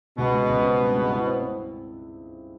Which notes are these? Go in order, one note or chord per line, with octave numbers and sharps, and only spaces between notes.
C#2 B2 B3
G#3
C#2
C4
G2
G#3
E4
C4
C4